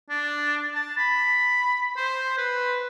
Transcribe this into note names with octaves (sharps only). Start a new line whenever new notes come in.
D4
A5
B5
C5
B4